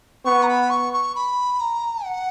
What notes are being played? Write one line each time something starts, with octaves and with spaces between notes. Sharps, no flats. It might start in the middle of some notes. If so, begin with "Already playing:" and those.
B3 C#6
A#5
B5
C#6
C#6
B5
A#5
F#5